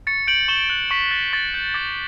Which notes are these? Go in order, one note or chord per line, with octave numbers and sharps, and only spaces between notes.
C#6 A6 C#7
G6 D7 F#7
C#6 E7 G7
F#6 D7 F#7
C#6 B6
F#6 A6
C#6 A6
G6
D6 A6